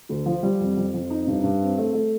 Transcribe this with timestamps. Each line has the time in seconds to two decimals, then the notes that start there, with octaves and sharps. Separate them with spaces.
0.09 D2
0.26 F3
0.43 G3
0.60 F2
0.77 F2
0.94 F2
1.10 D#4
1.27 G2
1.43 G2
1.61 C4
1.78 A3
1.94 A3